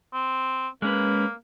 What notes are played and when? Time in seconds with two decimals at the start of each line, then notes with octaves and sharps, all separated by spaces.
0.13 C4
0.82 G#3 A#3 C#4 B4